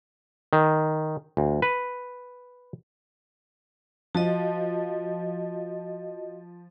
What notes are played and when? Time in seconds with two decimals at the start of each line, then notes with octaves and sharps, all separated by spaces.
0.53 D#3
1.37 D2
1.62 B4
4.15 F3 F#4 D#5